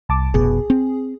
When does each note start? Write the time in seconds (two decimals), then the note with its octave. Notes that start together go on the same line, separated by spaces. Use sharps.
0.09 C2 A5 D6
0.34 F1 B2 G#4
0.70 C4